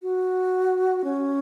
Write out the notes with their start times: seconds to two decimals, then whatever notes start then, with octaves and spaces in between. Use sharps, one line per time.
0.02 F#4
1.04 C#4